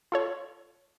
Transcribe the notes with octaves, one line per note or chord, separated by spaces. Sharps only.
F4 A4 C#5